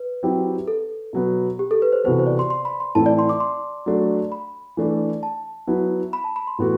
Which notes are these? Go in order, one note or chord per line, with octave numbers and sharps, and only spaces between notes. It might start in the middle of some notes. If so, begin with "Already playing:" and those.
Already playing: B4
F#3 C4 E4 G4
A4
B2 F#3 B3
G4
A4
B4
C5
C3 E3 B3 F#4 A4 C5
C5
D5
C6
C6
B5
C6
A2 E3 A3 C4 E4 A5
D5
C6
D6
C6
F#3 A3 D4
B5
E3 A3 D4
A5
F#3 B3 E4
B5
A5
B5
C6
A2 E3 B3 F#4 A4